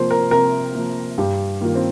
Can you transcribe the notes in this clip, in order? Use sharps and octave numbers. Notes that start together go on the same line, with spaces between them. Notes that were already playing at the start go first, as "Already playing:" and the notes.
Already playing: C3 F3 A#3 C5
A#4
C3 A#4
F3 A#3
G2 G4
D#3 A#3 F4
C4